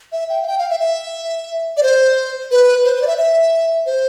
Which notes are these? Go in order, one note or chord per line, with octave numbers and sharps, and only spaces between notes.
E5
G5
F5
G5
F5
E5
E5
D5
C5
B4
C5
C5
D5
E5
E5
C5